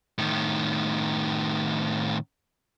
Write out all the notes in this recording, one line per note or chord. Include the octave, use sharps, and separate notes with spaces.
A2 D#3